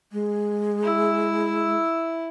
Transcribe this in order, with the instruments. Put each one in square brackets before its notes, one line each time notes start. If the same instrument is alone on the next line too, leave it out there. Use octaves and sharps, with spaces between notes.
[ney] G#3
[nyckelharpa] E4 E5